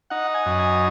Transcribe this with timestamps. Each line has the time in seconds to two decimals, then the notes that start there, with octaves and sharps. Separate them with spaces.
0.10 D#4 F#5
0.34 G#5
0.46 F#2
0.59 G#5